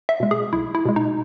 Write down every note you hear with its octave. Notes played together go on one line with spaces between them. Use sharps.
E5
B2 G#3
G#4
B1 E4
E4
B2 G#3
D#4